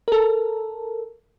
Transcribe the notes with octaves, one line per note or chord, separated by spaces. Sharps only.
A4 A#4